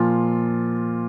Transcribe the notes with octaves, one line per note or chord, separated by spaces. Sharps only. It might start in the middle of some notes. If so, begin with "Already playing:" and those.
Already playing: A#2 F3 F4